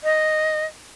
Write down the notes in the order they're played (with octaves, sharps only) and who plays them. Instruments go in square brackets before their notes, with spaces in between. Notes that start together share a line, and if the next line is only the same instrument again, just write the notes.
[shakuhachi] D#5